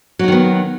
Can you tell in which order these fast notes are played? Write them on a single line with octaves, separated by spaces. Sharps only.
F#3 D#4 D#3 B3